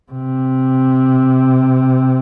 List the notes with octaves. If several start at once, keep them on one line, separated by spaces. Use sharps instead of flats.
C3